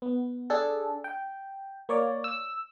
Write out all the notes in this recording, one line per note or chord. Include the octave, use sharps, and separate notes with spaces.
B3
D4 G#4 A4
G5
A#3 C#5 D5
E6